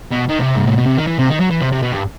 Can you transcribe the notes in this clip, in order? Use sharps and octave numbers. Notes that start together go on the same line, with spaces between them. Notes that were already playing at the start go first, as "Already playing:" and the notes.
B2
D#3
C3
G2
A2
B2
C3
D#3
E3
C3
D#3
F#3
E3
C3
C3
B2
G2